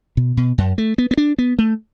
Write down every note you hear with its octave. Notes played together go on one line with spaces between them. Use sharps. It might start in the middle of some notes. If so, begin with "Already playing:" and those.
B2
B2
F#2
A3
B3
B3
D4
B3
A3